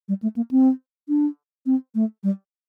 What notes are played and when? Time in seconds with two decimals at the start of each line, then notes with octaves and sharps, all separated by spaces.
0.09 G3
0.23 A3
0.36 A#3
0.51 C4
1.09 D4
1.66 C4
1.95 A3
2.23 G3